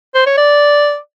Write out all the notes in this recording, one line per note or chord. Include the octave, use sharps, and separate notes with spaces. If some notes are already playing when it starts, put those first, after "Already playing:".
C5
C#5
D5